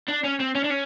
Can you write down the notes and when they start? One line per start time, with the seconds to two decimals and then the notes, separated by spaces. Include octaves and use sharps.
0.09 D4
0.24 C#4
0.40 C4
0.55 C#4
0.64 D4
0.70 C#4